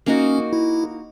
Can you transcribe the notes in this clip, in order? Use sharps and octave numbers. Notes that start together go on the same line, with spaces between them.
A#3 C#4 D#4 F#4
E4